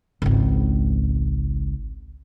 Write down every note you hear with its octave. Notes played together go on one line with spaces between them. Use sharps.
G#1 C#2